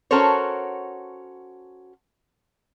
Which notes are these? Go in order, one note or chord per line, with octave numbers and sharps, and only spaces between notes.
C#4 F#4 A4 A#4 C5 C#5